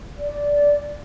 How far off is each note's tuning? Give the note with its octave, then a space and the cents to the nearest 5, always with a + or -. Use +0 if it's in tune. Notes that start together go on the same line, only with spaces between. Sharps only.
D5 -15